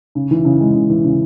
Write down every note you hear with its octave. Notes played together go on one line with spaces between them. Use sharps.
C#3
E3
C#3
G#3
C#3
E3
C#3